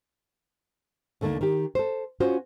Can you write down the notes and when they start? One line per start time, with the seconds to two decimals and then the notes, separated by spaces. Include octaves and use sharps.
1.21 D#2 D3 A3 A#3 D#4
1.41 D#3 G4
1.75 A4 C5
2.20 C#4 F4 F#4 C5